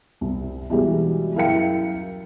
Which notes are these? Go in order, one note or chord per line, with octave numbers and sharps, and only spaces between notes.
C2
B2 E3 G3 G#3
F#2 E4 A#4 F5 G5 C#7